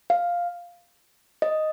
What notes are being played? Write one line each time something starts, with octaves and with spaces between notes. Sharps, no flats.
F5
D#5